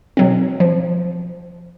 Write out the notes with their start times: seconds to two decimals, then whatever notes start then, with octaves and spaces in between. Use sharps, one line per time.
0.17 B2 F#3 C4
0.60 F3